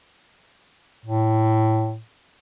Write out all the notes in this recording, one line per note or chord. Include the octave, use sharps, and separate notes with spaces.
A2